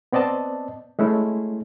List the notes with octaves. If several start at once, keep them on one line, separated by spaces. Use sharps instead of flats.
B3 C4 D5 D#5 A5
G#3 A3 C#4 E4